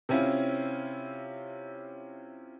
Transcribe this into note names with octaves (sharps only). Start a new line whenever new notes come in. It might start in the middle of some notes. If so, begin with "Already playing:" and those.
C3 C4 C#4 E4 F4